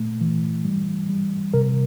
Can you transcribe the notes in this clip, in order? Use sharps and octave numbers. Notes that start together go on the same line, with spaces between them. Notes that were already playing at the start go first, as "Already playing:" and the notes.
Already playing: A#2 A3
E3
G3
G3
C3 A#4